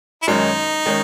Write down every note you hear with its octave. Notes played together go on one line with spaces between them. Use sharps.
E4
F#2 D#3 G#3 C#4 D#4
D#3 G#3 C#4